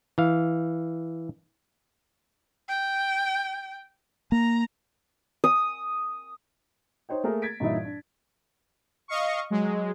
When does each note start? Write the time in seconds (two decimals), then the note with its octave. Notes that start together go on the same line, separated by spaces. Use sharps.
0.18 E3 F5
2.69 G5
4.32 A#3 A#5
5.44 D#6
7.09 D#4 C5 C#5 G5
7.24 A3 A#3 G#4 A#4
7.42 G#6 A6 B6 D7
7.60 G2 A#2 E3 D#4 E4
7.85 D4
9.08 D#5 F5 C#6
9.50 F#3 G#3